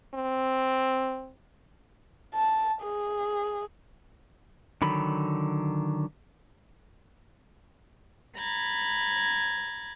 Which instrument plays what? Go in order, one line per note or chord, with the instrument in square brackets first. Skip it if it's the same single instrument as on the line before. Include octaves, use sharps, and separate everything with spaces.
[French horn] C4
[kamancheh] A5
G#4
[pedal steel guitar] D3 D#3 F#3 B5
[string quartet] A#5 B5 G#6 A6